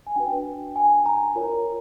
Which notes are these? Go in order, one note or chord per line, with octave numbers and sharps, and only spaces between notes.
G#5
D4 F#4 B4 G5
G#5
A#5
F4 A#4 C#5